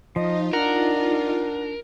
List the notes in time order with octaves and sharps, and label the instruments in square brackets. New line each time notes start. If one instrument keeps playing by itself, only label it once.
[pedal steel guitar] F3 [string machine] D#4 F4 [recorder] D#5
[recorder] D4 [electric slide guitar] A#4 [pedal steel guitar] F#5